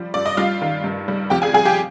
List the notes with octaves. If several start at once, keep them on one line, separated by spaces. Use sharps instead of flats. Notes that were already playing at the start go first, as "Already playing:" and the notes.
Already playing: F3 G3
G2 D5
D#5
G3 F4 F5
D#3
G2
G3
F2 G4 G5
G#4 G#5
G3 G#4 G#5
G4 G5